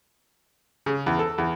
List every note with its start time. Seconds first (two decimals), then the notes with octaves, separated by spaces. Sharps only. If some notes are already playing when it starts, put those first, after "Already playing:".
0.86 C#3
1.06 E2
1.19 A4
1.38 E2